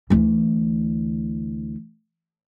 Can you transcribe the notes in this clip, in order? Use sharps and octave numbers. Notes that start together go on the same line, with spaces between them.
D2 E3